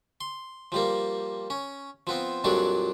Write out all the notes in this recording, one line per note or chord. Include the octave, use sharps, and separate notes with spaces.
C6
F3 G3 A#3
C#4
F3 B3 C4
F2 A#2 F#3 G3 D4